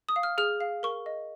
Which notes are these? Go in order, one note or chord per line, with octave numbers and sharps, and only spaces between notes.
D#6
F5
F6
G#4 F6
F5
A#4 C#6
D#5